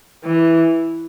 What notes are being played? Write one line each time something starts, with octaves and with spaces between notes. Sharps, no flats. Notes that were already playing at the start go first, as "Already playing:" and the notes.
E3